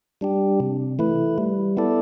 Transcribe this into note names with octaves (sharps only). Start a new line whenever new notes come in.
G3 D4 G4
C3
E3 A3 E4 B4
G3
B3 E4 A4 D5